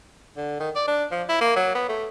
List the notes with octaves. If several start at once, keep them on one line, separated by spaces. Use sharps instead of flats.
D3
D#3
D5
D4
F3
E4
A#3
F#3
B3
A3